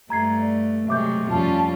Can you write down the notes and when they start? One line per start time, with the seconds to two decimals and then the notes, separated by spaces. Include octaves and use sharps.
0.10 G2 A3 A#5 G#6 C7
0.39 D5
0.88 C3 F#3 G#3 A3 E5 D6 G6
1.30 F2 G3 C#4 F4 A5